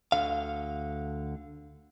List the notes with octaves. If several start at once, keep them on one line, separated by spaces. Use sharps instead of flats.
D2 D3 F5